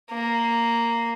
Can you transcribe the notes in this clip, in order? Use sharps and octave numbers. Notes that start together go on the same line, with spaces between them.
A#3